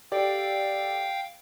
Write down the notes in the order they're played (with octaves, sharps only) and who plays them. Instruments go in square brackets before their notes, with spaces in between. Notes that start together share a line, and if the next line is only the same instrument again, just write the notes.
[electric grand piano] G4 A4 D5 [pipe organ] F5 G5